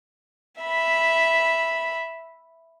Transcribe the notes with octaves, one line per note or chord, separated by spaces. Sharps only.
E5 B5